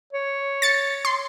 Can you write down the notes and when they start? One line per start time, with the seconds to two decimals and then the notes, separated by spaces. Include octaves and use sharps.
0.13 C#5
0.62 A6 C#7
1.05 C6